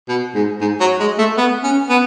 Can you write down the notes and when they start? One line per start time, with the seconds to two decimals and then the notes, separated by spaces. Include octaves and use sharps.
0.09 B2
0.35 G#2
0.61 G#2
0.80 F#3
1.00 G#3
1.18 A3
1.38 B3
1.63 C#4
1.89 B3